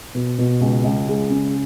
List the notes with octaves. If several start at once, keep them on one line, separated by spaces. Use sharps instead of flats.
B2
B2
C#2
C#2
G#3
C#3